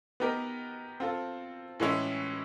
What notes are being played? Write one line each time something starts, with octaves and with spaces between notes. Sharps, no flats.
B3 D#4 G4 A#4
C4 F4 A4
A2 E3 G#3 C#4 E4